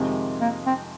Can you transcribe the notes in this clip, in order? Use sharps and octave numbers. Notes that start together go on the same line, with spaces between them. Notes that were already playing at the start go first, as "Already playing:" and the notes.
Already playing: F2 C3 D#3 G#3 C4
A#3
C4